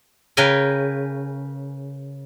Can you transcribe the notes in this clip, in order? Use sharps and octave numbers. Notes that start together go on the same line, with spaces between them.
C#3 A#4 B4 G5 G#5